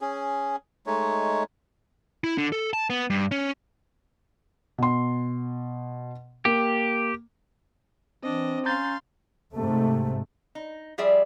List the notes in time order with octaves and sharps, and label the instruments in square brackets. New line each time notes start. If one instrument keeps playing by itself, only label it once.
[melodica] C#4 G#4
G#3 A3 D#4 C#5
[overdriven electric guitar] E4
D3
A4
A5
B3
G2
C#4
[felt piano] B2 C6
[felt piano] A#3 [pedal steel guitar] G4
[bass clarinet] E3 [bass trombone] C4 [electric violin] D4 D#5
[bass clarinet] C#4 [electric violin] F5 C6 [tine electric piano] A#5 G6 A6
[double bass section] G#2 C3 A3
[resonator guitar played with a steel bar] D#4
F3 G3 G#4 D5 E5